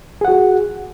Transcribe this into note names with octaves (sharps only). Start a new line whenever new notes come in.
F#4 G#4 F#5